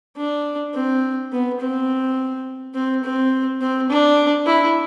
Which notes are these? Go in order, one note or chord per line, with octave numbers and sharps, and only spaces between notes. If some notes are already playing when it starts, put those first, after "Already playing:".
D4
C4
B3
C4
C4
C4
C4
D4
E4